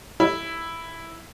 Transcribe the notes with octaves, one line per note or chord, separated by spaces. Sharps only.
E4